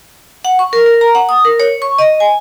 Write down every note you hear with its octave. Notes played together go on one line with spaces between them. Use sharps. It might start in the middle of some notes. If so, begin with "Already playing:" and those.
F#5
C#6
A#4
A#4
A#5
F#5
D#6
A#4
C#5
C#6
D#5
G#5